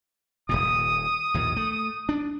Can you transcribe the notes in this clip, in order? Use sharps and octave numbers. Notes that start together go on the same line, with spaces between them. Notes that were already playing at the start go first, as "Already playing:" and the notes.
D#1 G#1 A#2 D#6
A#1 D#2 A2
A3
D4